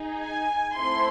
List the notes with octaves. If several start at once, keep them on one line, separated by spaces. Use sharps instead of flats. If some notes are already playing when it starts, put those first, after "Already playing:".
Already playing: D#4 G#4
G#5
A3 C4 E4 C6